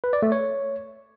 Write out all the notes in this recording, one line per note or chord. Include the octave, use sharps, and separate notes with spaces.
B4
D5
A3
C#5